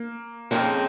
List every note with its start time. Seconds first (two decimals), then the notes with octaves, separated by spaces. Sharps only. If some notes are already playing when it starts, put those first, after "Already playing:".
Already playing: A#3
0.51 F2 C#3 G#3 A#3 C4